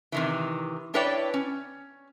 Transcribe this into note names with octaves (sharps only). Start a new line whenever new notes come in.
C3 D#3 E3
D4 E4 B4 C#5 D5 G5
C#4